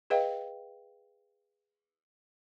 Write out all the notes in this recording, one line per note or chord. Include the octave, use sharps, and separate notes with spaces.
G#4 B4 D#5 F5 G5